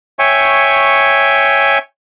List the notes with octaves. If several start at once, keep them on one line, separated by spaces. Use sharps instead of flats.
C#5 E5 G5 G#5 C#6